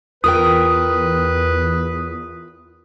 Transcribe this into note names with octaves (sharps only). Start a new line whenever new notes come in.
E2 F4 A#4 B4 G5 D#6